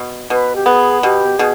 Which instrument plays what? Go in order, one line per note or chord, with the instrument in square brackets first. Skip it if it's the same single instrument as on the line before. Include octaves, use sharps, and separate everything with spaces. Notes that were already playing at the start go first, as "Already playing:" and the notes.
Already playing: [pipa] B2
[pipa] B2 [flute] B4
[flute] G4
[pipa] B3 [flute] G#4
[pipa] B2 [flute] G4
[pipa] B2 [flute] G#4